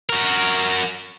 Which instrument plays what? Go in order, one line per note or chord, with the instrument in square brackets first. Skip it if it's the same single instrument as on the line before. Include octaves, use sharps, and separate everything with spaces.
[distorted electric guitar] F#4 A#4